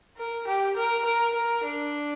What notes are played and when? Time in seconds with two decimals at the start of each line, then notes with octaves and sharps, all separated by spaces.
0.17 A#4
0.47 G4
0.76 A#4
1.04 A#4
1.34 A#4
1.63 D4